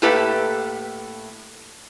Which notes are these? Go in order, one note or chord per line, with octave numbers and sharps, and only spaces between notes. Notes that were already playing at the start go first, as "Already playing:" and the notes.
A2 A#3 G4 A4 B4 E5